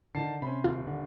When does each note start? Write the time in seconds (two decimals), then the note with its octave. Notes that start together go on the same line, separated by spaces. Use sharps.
0.15 D3 D#3 A5 C7
0.42 C3 C#4 C5 B5
0.64 D#1 F4
0.87 D3